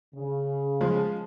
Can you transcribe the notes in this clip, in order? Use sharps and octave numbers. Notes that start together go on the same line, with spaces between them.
C#3
F3 G#3